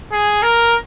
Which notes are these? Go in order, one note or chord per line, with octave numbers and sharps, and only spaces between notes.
G#4
A#4